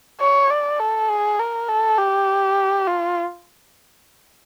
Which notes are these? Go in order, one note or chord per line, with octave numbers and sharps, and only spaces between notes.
C#5
D5
A4
G#4
A#4
A4
G4
F4